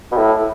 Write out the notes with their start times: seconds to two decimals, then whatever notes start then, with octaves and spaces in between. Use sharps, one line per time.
0.12 B2
0.17 A2